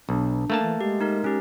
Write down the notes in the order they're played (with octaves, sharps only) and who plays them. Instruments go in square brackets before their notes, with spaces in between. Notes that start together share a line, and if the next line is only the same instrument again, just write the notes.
[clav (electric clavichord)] B1 [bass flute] D4
[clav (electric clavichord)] A3 A#3 A5
[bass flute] E3
[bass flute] G#3 [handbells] G4
[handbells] D#4 A#4
C#4 G4